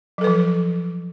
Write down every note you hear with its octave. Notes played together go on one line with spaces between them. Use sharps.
F3 F#3 A4 B4